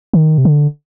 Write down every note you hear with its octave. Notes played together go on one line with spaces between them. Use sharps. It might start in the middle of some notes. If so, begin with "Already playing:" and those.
D#3
C3
D3